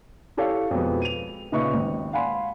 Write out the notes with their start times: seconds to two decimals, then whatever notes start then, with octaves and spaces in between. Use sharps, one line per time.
0.37 E4 G4 A4 C#5 F5
0.71 F2 B2 F3 G#3 B3
1.02 D#7 F7
1.52 A#2 C#3 D#4 B4 E5 C#6
1.73 G#1 D#2
2.13 F5 F#5 G#5 B5 C6